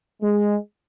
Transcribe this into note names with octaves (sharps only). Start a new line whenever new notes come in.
G#3